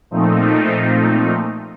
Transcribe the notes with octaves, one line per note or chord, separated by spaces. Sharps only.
A#2 F3 A3 C4 D#4